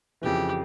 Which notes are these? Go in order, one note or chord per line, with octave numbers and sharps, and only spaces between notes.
F2 C#3 E3 G4